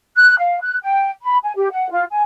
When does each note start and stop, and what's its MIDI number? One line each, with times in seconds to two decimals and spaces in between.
0.16 0.37 90
0.39 0.61 77
0.61 0.77 90
0.83 1.11 79
1.23 1.38 83
1.44 1.52 80
1.56 1.71 67
1.71 1.89 78
1.90 2.04 65
2.12 2.23 80